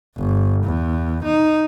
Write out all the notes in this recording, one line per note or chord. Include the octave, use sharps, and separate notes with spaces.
G1
E2
D#4